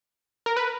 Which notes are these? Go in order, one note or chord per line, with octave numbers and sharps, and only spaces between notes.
A#4
B4